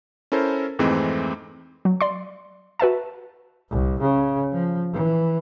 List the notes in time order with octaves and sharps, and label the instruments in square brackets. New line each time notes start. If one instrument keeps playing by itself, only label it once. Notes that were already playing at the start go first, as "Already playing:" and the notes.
[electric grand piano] C#4 E4 A4 A#4 C5
F2 G#2 E3 G#3 A3 C4
[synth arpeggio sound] F#3
D5 C6
F#4 B4 E5 A5
[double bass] C2
C#3
F3
E3